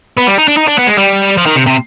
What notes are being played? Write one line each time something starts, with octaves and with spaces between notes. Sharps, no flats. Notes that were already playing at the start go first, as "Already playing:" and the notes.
B3
G3
D#4
D4
D#4
D4
B3
G#3
G3
F3
D#3
C3
C3